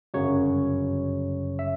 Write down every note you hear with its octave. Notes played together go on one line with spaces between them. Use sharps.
G1 F#2 C#3 F#3 C#5
E5